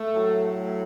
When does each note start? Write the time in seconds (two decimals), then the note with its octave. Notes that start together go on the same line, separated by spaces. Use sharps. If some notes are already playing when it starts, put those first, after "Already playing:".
Already playing: A3
0.14 A2 F#3